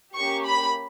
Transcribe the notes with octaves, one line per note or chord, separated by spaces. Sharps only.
A#3 C#4 G4 C#6
B5